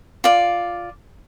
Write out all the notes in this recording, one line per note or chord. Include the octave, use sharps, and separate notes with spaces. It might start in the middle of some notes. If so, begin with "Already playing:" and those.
F4 D5